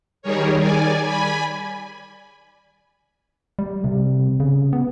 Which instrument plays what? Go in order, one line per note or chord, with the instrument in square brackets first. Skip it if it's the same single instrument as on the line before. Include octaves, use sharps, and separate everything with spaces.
[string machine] D#3 G3 G#4 A#4 C#5
D5 G#5
G#5 B5
[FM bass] G3
C3
C#3
B3